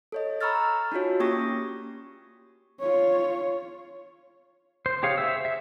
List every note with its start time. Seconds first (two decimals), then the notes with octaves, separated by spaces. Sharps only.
0.12 A4 C#5 D#5
0.41 A#5 B5 C#6 E6 F6 A6
0.92 D4 D#4 F4 F#4 C#5
1.20 A#3 C#4 G4 C#6 D#6 A#6
2.80 F4 C#5
4.86 C5
5.03 G4 G#4 C#5 F5
5.18 C5 E5 E6
5.45 E5